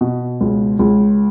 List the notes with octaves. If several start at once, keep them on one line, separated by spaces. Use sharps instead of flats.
B2
C#2
C#2